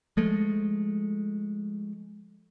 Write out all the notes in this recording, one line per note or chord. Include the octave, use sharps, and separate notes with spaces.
F3 G#3 A3